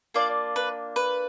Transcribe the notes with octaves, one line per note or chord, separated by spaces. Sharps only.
A#3 D4 F4 D5
B4
B4